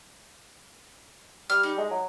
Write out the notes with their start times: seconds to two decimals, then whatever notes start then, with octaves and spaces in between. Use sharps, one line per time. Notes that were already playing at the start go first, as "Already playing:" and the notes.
1.50 G3 F6
1.63 D#4
1.78 G#3
1.91 F#3